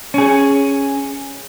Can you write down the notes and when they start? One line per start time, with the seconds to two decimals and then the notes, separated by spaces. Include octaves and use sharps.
0.14 C#4 G#4